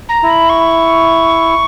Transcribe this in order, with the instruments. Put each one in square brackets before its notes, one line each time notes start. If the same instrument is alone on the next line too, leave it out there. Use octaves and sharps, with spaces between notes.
[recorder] A#5
[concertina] E4
[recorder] B5
C#6